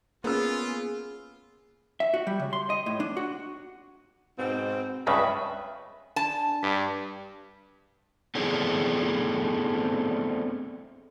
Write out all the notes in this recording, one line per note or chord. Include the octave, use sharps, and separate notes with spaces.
A#3 B3 C#4 F4 G#4 E6
E5
F#4
G3
C#3
C6
D#5
A2
D4
F#4
G#2 B2 C4
C#2 G2 C#3 B4 E5
D4 A5
G2 B6
A3 B3 C4 D4 E4 G#4